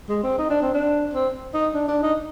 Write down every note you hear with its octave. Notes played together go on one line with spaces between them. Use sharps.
G#3
C4
D#4
D4
C4
D4
C4
D#4
D4
D4
D#4